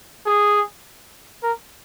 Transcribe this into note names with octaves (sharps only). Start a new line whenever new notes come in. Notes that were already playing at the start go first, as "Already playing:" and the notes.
G#4
A#4